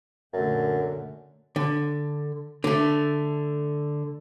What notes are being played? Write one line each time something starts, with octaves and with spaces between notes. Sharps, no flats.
F#2 A#2 D3 A3
D3
D3 A3